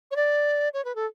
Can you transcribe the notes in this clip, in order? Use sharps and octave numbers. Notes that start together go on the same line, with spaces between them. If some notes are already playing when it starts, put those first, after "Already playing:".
C#5
D5
C#5
B4
A4